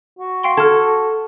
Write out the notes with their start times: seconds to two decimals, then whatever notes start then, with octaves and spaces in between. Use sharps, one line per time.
0.19 F#4
0.43 F5 G5 C6
0.57 A4 F6 G#6